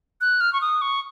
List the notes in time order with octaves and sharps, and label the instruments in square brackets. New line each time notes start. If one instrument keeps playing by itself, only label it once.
[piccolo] F#6
F6
C#6
D#6
C#6